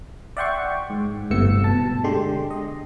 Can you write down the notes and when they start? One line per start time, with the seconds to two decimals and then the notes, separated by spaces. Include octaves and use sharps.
0.37 D5 E5 F#5 G5 C6 C#6
0.90 G#2
1.30 G1 A2 C3 B3 E6 C#7
1.64 B2 A5
2.04 D3 G#3 G4 C6
2.50 D#5